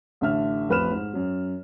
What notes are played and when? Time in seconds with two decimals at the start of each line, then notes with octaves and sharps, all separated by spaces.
0.21 A1 D3 E5 F6
0.69 A1 F2 B4 B5 F6 E7
0.92 G#2
1.13 F#2 F#3